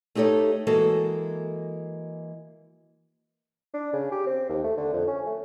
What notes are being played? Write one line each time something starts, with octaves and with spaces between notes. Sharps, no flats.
A3 D#4 G4 A4 C#5
E3 G#3 A#3 F#4 A4
D4
C#3
G4
C4
D#2
A3
D3
F2
C#4
A3